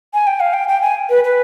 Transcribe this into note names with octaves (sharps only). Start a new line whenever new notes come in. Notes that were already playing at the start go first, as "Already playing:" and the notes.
G#5
G5
F5
G5
G5
G#5
B4
B4